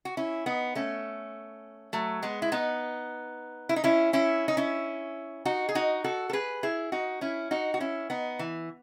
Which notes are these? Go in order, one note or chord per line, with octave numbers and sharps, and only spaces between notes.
F#4
C#4 E4
B3 D#4
A3 C#4
F#3 A3
G#3 B3
E4
B3 D#4
E4
D#4
C#4 E4
C#4 E4
D#4
C#4 E4
D#4 F#4
G#4
D#4 F#4
F#4 A4
A4
G#4 B4
E4 G#4
D#4 F#4
C#4 E4
D#4 F#4
F#4
C#4 E4
B3 D#4
E3